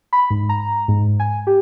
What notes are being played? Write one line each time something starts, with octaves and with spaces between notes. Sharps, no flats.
B5
G#2
A#5
G#2
G#5
G4